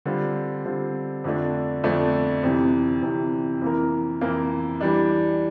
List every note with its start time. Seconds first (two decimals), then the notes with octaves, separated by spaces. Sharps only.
0.06 D3 G3 C4 F4
0.65 D3 G3 C4 F4
1.24 F2 D3 F3 A3 D4
1.84 F2 D3 F3 A3 D4
2.43 F2 C3 E3
3.03 F2 C3 E3
3.62 F2 E3 A#3 E4 A#4
4.21 F2 E3 A#3 E4 A#4
4.81 E3 G3 D4